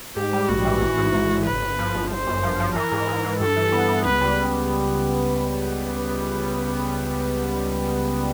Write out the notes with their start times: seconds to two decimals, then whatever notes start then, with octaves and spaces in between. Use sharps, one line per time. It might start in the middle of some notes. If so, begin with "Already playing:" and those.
0.16 G#2 G4
0.33 G3
0.49 A#1 F#4
0.65 E3
0.81 A1
0.98 G#2
1.13 A1
1.30 A1
1.46 G1 B4
1.62 G1
1.79 F3
1.95 G1
2.11 G1 C5
2.27 F#2
2.43 F3
2.60 F3
2.75 E3 A#4
2.92 G#2
3.08 G#2
3.24 E3
3.40 G2 A4
3.57 E3
3.72 B3
3.89 B3
4.05 C#2 B4
4.21 G3